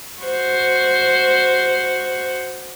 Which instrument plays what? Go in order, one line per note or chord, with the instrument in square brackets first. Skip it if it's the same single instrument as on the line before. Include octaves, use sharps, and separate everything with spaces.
[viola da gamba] F#4 C5